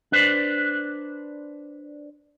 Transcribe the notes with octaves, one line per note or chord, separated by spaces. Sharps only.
D4 B4 C5 D5